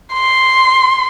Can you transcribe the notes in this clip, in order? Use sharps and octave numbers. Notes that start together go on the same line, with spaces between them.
C6